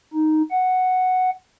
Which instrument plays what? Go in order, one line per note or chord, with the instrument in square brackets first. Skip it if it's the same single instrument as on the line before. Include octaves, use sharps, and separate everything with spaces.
[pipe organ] D#4
F#5